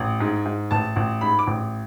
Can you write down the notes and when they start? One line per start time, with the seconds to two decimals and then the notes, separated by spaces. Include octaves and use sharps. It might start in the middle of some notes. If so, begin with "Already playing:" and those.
Already playing: A1
0.20 G#2
0.45 G#2
0.71 A1 A5
0.96 A1
1.21 G#2 B5
1.39 D6
1.47 A1